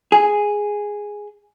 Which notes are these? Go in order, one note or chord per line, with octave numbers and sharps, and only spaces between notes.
G#4